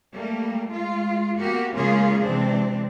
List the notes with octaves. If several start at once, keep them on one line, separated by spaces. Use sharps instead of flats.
G3 A3 A#3
G#3 F4
A#3 B3 F#4 G4
C#3 G#3 A#3 C#4 F4 G#4
C3 E3 G#3 C4 D4